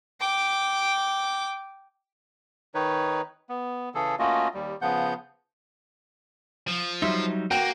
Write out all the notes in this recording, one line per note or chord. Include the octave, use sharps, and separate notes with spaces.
G5 D6
D#3 D#4 B4 C#5
B3
C#3 E3 G#4 A4
A3 A#3 C#4 F4 F#4 D#5
D#2 G3
C#3 F3 B3 F#5 G6
F3
F#3 G3 D#4 E5 C6
A#3 F#4 G5